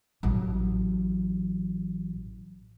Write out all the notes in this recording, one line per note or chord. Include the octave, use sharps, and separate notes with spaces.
A1 F#3